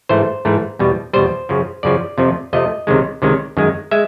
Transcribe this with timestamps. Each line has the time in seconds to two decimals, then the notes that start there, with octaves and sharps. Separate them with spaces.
0.09 G#2 E3 A3 C5
0.45 G#2 E3 A3
0.79 E2 B2 G3
1.13 E2 B2 G3 C5
1.49 F#2 C#3 F3
1.83 F#2 C#3 F3 D5
2.18 F2 C3 F3 A3
2.53 F2 C3 F3 A3 D#5
2.87 C#2 C3 D#3 G#3
3.22 C#2 C3 D#3 G#3
3.57 F#2 D#3 G#3
3.91 G#3 E5